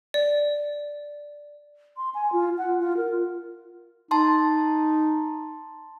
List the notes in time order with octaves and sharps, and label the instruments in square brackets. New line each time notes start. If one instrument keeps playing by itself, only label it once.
[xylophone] D5
[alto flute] C6
G#5
F4
F#5
F4
A#4
[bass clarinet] D#4 [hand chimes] A5 C6